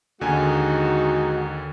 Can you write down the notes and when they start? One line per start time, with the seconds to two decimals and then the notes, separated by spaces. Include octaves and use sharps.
0.21 D#2 D3 G#3 D#4 F#4 G#5